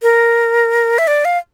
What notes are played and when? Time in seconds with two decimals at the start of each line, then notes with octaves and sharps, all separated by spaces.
0.02 A#4
0.98 E5
1.07 D5
1.25 F5